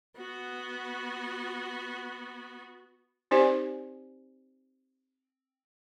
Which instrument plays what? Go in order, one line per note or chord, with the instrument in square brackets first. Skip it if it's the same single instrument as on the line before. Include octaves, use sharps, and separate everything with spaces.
[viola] B3 F#4
[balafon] C4 D#4 G4 C5 D5 G#5